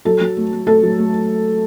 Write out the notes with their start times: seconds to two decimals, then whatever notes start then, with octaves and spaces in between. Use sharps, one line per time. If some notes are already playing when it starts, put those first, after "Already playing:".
0.05 F#3 A4
0.21 F#3
0.37 A3
0.52 A3
0.67 A3 A4
0.83 F#3
0.98 A3